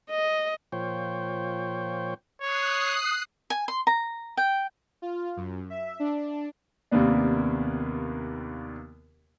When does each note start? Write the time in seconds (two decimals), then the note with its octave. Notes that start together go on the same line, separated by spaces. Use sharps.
0.10 D#5
0.72 A#2 F3 C5 C#5 G5
2.42 C#5 D#6 F#6 C7
3.50 G#5
3.68 C6
3.87 A#5
4.37 G5
5.02 F4
5.37 F#2
5.70 E5
6.00 D4
6.91 D#2 C3 A#3 B3 D4